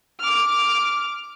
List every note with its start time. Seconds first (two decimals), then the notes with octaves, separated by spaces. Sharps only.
0.20 D6 F6